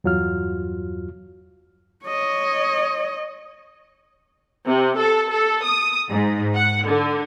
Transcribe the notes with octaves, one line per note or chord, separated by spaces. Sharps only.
E2 G2 F#3 F4 F#4 F6
C#5 D#5
C3
A4
A4
D#6
G#2
F#5
D3